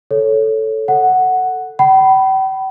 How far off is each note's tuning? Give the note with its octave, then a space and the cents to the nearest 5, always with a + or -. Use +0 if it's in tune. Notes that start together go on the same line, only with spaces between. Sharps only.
A4 +0 C#5 +0
A4 +10 F#5 +0
G5 -45 B5 +0